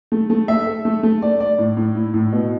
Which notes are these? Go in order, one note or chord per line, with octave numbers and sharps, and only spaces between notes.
A3
A3
E5
A4
A3
A3
D5
D5
A2
A2
E4
A2
B2